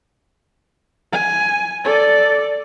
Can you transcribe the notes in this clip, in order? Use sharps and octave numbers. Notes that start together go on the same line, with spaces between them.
G#5
A4 D5